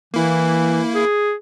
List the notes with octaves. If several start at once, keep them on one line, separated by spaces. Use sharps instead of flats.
E3 A#3 E4
G#4